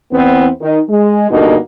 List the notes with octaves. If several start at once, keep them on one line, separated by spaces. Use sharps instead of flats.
E2 B3 C4
D#3 D#4
G#3
G2 B2 D3 A#3 D#4 F#4